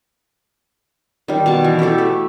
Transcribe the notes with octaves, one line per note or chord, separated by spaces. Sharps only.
D#3 G3
B2 A5
E3
E4 F#4 G4 A4
A3